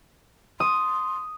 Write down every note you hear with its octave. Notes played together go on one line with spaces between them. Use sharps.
C6 D#6